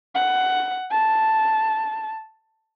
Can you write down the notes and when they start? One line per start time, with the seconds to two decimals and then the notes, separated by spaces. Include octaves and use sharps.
0.15 F#5
0.91 A5